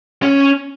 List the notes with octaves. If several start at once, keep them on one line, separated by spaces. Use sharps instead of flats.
C#4